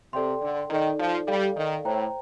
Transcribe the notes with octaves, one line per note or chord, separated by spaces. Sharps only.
C3 A4 D5 G5 C6
D3
D#3 D#4 A4 D5
F3
G3 A4 D5 F5
D#3
A2 C5 G5 A#5